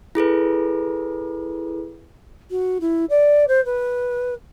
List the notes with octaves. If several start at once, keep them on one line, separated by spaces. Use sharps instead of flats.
E4 G#4 A4 B4
F#4
E4
D5
C5
B4